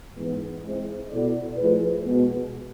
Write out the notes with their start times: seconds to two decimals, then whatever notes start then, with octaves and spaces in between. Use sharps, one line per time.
0.16 G#2 E3 G#3 B3
0.64 G#3 C4 E4
1.10 B2 B3 E4 A4 D5
1.57 F3 A3 E4 G#4 B4
2.05 B2 G#3 B3